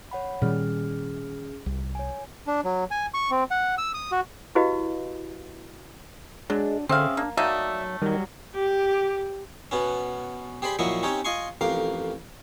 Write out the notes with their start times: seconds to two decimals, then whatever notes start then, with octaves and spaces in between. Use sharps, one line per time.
0.11 C#5 F#5 B5
0.42 A#2 D#3 G3 C#4 G#4 F6
1.66 C2
1.95 C#5 G#5
2.47 D4
2.65 F#3
2.91 G#5
3.14 C#6
3.31 C4
3.51 F#5
3.78 E6
3.94 D#6
4.12 F#4
4.55 E4 F#4 G4 B4 D#5 F5
6.50 F#3 G#3 D4
6.89 D3 C4 C#4 G#4 E5 F5
7.17 A#3 D4
7.37 F#3 A3 A#3 D#4 D5 E5
8.02 D#3 F#3 G3
8.55 G4
9.71 B2 B3 C#4
10.62 G4 G#4 C5 D5 B5
10.79 A#2 F3 F#3 E4 D#5 C#6
11.03 C4 C#4 D#4 G4 C#5
11.25 F4 D#5 G#5 C6 C#6
11.61 A1 F2 A#4 F5 D6